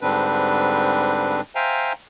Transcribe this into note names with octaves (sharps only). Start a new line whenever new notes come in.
G#2 D3 G3 C4 D4 B4
C5 E5 F5 G5 G#5 A#5